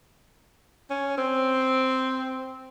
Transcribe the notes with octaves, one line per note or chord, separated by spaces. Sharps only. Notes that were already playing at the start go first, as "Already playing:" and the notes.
C#4
C4